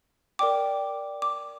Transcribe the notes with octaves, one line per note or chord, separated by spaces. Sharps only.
A#4 D5 G5 D6
D6